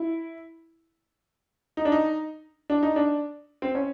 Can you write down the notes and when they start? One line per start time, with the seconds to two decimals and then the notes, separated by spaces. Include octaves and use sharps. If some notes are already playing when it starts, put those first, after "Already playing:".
Already playing: E4
1.77 D#4
1.85 D4
1.92 D#4
2.70 D4
2.83 D#4
2.96 D4
3.62 C4
3.75 C#4